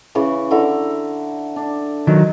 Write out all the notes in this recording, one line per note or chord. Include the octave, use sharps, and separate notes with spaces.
C#3 E3 C#6
D3 E4 A#5
D4
D#3 F#3 D#4